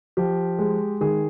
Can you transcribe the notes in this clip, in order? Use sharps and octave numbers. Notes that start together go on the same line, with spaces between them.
F3 G4
G#3
D#3 G#4